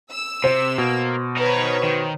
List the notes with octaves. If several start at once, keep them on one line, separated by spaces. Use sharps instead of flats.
E6
C3 C5
B2 A#3
D#4 A#4 B4 C#5
D#3